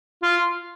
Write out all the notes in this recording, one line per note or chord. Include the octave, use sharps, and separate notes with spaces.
F4